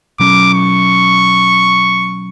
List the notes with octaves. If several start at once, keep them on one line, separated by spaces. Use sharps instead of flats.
B2 F#3 C#4 D6
C#6